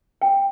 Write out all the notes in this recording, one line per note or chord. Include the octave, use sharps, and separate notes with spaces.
G5